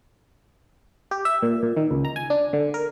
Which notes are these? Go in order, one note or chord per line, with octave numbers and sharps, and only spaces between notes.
G4
E5
A#2
A#2
D#3
C#2
A#5
G#5
D4
D3
A#4